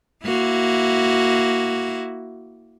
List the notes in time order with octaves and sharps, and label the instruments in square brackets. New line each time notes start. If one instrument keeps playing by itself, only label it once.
[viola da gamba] A#3 E4 F#4